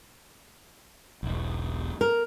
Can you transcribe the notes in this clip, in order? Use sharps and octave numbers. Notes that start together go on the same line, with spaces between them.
E1 B1
A#4